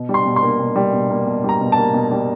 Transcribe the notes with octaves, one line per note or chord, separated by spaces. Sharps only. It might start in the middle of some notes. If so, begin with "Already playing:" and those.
Already playing: B2
G3
C6
B2
C6
A#3
B2
G3
B2
A#3
B2
G3 A#5
B2
A5
A#3
B2
G3